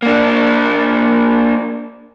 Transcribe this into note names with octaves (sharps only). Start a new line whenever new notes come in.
A#3 D4